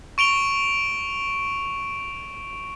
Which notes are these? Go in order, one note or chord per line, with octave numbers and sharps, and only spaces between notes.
C#6 D7 F7 G7